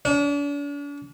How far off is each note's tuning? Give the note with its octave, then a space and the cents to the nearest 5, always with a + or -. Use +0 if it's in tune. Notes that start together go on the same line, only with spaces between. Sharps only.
D4 -40